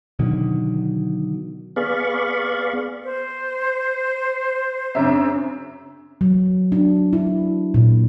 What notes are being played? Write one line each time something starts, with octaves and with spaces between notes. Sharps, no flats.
B2 D3 D#3 F#3
B3 G#4 D5 F5 B5 C#6
C5
F#2 C#3 C4 D4 E5
F#3
D4
E4
A#2